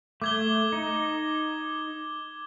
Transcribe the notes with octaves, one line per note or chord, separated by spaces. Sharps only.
A3 D6 G#6 G7
D#4